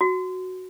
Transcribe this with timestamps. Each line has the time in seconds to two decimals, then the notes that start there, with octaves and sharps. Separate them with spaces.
0.01 F#4